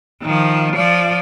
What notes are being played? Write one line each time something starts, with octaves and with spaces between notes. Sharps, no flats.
D#3 F3
F3 D5